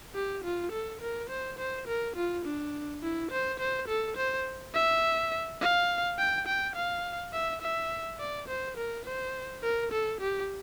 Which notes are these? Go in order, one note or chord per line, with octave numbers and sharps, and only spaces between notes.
G4
F4
A4
A#4
C5
C5
A#4
F4
D4
E4
C5
C5
A4
C5
E5
F5
G5
G5
F5
E5
E5
D5
C5
A#4
C5
A#4
A4
G4